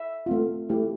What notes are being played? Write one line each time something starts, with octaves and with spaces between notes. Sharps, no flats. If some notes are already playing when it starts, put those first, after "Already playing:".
Already playing: E5
A3 C4 F4
A3 E4 G4